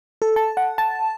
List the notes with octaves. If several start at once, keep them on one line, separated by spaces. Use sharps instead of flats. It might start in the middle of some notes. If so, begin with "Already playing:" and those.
A4
A5
F#5
A5